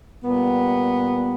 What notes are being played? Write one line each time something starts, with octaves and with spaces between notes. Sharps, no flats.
A#2 G3 B3